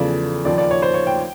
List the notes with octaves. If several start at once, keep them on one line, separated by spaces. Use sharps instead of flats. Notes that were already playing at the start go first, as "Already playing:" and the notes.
Already playing: E2 C#3 F3 A3 D5
D#2 C#3 F3 D5
D5
C#5
C5
C#5
G5